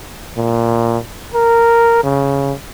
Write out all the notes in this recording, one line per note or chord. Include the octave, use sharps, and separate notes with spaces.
A#2
A#4
C#3